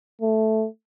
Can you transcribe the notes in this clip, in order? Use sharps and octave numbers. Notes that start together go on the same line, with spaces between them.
A3